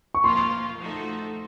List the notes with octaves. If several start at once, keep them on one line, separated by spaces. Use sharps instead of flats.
C#6
F3 A#3 F4 C6
F3 A3 D#4 F#4 A4